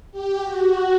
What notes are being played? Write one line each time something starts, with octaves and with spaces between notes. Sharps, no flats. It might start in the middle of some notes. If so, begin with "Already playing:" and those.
G4
F#4